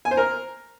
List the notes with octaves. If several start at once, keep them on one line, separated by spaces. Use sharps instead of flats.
G#5
C5
A#4